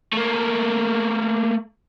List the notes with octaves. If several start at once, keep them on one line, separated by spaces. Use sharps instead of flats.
A3 A#3